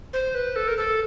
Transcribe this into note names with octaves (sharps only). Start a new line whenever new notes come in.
C5
B4
A4
A#4
A4